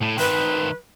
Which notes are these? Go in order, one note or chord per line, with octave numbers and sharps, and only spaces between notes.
A2
D#3 B4 C5